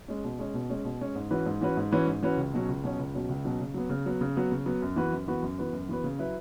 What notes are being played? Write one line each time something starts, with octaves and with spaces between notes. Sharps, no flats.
G#3 C#4
B2
G#3 C#4
B2
G#3 C#4
B2
G#3 C#4
G#2
E3 C#4 F#4 B4
G#2
E3 C#4 F#4 B4
G#2
E3 C#4 F#4 B4
G#2
E3 C#4 F#4 B4
C#2
B2 F#3 C#4
C#2
B2 F#3 C#4
C#2
B2 F#3 C#4
C#2
B2 F#3 C#4
C#3
F#3 B3
C#3
F#3 B3
C#3
F#3 B3
C#3
F#3 B3
F#2
E3 B3 F#4 B4
F#2
E3 B3 F#4 B4
F#2
E3 B3 F#4 B4
F#2
E3 B3 F#4 B4
C#3
F#3 E4 B4